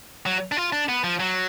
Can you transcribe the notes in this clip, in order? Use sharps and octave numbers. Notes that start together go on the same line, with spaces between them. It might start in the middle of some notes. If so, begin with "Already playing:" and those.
F#3
D4
F4
D4
B3
F3
F#3